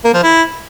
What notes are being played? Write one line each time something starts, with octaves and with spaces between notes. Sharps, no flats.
A#3
F3
E4